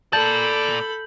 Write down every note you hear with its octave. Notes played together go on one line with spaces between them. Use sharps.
A#2 A4 D5 A5 B5 G6 F#7